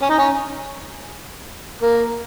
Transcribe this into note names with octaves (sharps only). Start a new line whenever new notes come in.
C#4
D#4
C#4
A#3